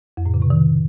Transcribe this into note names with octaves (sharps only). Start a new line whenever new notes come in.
F2
A2
C#3
C3
D#3